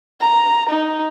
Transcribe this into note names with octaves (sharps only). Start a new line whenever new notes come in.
A#5
D#4